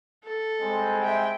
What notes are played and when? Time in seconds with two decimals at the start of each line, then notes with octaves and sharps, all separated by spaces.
0.25 A4
0.62 G3 G#3 C4
1.03 E5 G5